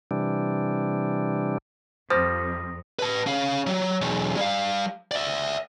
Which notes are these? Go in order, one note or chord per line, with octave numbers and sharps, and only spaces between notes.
C3 E3 G3 D4
F2 F3 G3 C5 D#6 A#6
B4 A5
C#4 F5
F#3
B1 E2
G3 F5
D5 E5